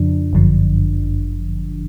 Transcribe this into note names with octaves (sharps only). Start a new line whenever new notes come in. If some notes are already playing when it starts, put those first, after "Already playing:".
Already playing: F2 C#3 F3 D4
G1 F#2 D3 F3